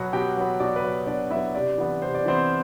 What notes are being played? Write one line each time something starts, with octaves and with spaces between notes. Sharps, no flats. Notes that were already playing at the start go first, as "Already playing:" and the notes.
Already playing: B2 F#3 B3 F#4 F#5
B2 G4 G5
F#3 B3
B2 D5 D6
B4 B5
F#3 B3
B2 D4 D5
F#3 B3 E4 E5
C3 D4 D5
E3 B3
C3 C5
D5
E3 B3 C4 C5